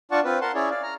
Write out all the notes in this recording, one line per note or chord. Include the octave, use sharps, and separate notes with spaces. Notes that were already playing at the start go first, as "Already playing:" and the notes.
D4 F4 D5 F#5 A5 C#6
C4 F4 B4
A#4 F#5 A5 C6
C#4 E4 G#4 C#5 D5
D5 F5
A#5 F6